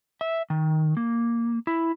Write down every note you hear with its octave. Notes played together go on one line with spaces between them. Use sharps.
E5
D#3
A#3
E4